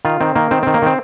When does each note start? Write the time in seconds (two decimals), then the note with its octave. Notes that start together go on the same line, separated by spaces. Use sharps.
0.05 D#3 F4
0.20 D#3 C4
0.36 D#3 A#3
0.51 D#3 C4
0.63 D#3 C4
0.74 A#3
0.82 D#3 C4